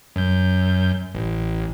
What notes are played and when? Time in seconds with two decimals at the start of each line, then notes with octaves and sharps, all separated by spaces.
0.16 F#2 G6
1.15 A1